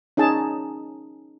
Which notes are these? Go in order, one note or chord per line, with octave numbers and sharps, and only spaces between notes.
C#4 D#4 G#4 A5